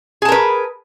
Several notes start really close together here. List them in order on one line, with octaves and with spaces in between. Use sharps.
G#4 A5 A#4 B4